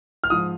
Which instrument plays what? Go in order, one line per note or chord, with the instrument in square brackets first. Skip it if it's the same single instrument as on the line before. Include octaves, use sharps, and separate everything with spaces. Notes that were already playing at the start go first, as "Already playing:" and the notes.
[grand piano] F6
G#2 F3 D#6